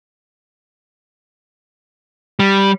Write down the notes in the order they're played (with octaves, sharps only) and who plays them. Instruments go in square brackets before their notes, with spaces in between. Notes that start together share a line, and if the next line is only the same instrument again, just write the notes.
[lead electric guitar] G3